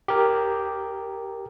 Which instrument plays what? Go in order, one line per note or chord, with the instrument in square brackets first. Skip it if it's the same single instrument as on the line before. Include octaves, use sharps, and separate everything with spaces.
[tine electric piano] G4 A#4